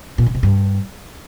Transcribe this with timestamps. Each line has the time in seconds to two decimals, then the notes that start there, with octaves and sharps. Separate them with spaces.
0.18 A#2
0.26 D3
0.35 C3
0.43 G2